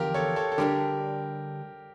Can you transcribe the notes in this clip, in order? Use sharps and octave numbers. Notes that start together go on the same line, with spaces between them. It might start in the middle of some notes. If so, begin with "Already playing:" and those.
Already playing: E2 D3 F3 F4 G4 A#4
A4 C#5
A4 C#5
A4
D3 G3 D4 G4 A#4